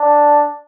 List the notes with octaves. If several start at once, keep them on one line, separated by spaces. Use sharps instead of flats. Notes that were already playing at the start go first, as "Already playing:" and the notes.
Already playing: D4